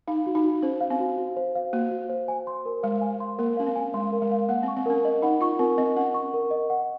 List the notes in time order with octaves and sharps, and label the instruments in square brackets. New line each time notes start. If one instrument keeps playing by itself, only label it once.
[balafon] D#4 [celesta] F5
[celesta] F#4
[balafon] D#4
[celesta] F#4
[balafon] C#4 [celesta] C5
[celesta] F5
[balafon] C4
[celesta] F#4
F#4
C5
F5
[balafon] A#3 [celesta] F#4
[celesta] F#4
C5
G#5
C6
A#4
[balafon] G#3 [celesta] F5
[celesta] G#5
C6
[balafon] A#3 [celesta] A#4
[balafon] C#4 [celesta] F5
[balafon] C4
[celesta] G#5
[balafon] G#3 [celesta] C6
[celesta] A#4
[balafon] G#3
[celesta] F5
[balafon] A#3 [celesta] F#5
[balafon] C4
[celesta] C#6
[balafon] C4
[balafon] C#4 [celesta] A#4
[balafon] C#4 [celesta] D#5
[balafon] D#4 [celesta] F#5
[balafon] F4 [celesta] C#6
[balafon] C4 [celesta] A#4
[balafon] C4 [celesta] D#5
[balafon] C#4 [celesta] F#5
[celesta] C#6
A#4
D#5
F#5